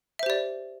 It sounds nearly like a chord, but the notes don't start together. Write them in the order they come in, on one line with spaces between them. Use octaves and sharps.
E5 C5 G4 D5